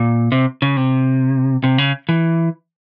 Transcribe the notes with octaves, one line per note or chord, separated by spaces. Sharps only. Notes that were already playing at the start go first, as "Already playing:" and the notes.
Already playing: A#2
C3
C#3
C3
C3
C#3
E3